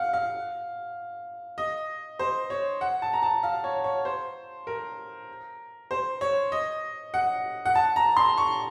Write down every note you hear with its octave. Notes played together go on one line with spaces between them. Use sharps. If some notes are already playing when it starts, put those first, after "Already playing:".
Already playing: F5 F#5
F5
D#5
C5
C#5
F#5
A5
A#5
A5
F5
C#5
C#5
C5
A#4
C5
C#5
D#5
F#5
F#5
A5
A#5
C6
C#6